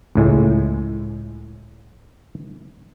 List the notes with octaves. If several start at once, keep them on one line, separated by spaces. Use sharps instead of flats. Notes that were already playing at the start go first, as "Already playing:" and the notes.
C#2 A2 G#3